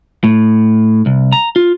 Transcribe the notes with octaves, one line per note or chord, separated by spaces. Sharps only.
A2
C2
A#5
F4